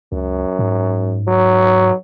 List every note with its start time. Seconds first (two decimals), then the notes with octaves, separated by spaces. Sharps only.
0.12 C#2 F#2
0.59 G#2
1.27 F#3